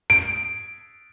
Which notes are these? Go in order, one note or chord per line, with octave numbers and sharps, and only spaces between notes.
D7